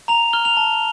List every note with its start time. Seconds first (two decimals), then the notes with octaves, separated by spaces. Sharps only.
0.08 A#5 F7
0.33 F6 G7
0.45 F7
0.57 A5